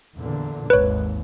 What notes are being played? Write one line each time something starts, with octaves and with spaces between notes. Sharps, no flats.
E2 A#2 D3
G#1 D#2 B4 C#5